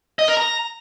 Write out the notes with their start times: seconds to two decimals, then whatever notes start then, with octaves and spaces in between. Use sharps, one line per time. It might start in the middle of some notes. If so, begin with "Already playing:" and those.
0.19 D#5
0.28 A#4
0.37 A#5